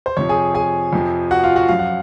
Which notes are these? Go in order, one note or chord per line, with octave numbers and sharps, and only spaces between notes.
C5
F2 C3 F3 C#5
G#4 G#5
G#4 G#5
F2 C3 F3
F#4 F#5
F4 F5
F#4 F#5
F#2 F3 F5
F#5